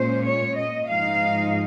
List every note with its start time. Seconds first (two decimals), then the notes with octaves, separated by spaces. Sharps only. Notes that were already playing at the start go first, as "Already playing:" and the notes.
Already playing: A#2 G#3 C#4 C5
0.26 C#5
0.58 D#5
0.88 G#2 F3 G#3 D#4 F5